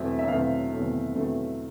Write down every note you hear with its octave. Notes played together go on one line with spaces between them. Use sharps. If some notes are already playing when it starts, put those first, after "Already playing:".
Already playing: E2 B2 F#3 A3 C4 E5
E5
E2 B2 F#3 A3 C4 F5
E2 B2 F#3 A3 C4
E2 B2 F#3 A3 C4